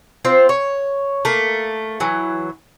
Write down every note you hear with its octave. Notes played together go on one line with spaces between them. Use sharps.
C4 F4 C5
C#5
A3 A#3
E3 F#3